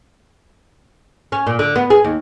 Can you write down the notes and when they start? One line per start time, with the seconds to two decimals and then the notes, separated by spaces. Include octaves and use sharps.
1.32 C#4
1.47 A#2
1.59 D3
1.76 B3
1.90 G#4
2.04 D#2